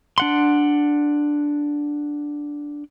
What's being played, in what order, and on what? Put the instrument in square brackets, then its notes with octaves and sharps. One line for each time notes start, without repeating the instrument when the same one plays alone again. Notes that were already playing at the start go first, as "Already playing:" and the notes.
[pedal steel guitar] D4 F#5 C6